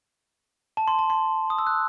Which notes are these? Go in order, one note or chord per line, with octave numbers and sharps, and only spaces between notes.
A5
C6
A5
C6
D#6
E6
F#6